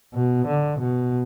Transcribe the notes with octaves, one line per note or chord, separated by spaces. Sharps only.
B2
D3
B2